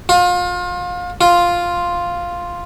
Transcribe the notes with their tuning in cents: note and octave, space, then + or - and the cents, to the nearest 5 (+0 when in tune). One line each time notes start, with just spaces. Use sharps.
F4 +30
F4 +0